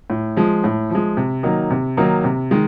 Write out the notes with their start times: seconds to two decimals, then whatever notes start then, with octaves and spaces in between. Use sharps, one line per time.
0.10 A2
0.36 F3 G#3
0.64 A2
0.90 F3 G#3
1.17 C3
1.43 D#3 F#3 A#3 D#4
1.70 C3
1.97 D#3 F#3 A#3 D#4
2.24 C3
2.51 D#3 G#3